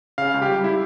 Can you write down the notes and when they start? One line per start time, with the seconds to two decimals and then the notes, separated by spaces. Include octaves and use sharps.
0.18 C#3 F5
0.34 C#2
0.42 G4
0.48 G3
0.64 E4